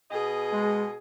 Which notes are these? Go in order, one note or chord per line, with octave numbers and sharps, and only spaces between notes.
B2 B3 G#4 D#5
G#3